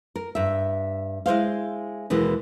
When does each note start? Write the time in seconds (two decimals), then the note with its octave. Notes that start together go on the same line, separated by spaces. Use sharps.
0.16 A#4
0.35 G2 E5
1.26 G#3 E4 C5 F5
2.10 D#2 B2 E3 G#3